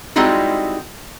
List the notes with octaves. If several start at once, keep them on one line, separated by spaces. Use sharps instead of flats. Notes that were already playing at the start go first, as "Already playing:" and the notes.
G3 G#3 C4 D#4 E4 F#4